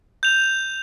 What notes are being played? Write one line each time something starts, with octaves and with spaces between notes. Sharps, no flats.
G6 F7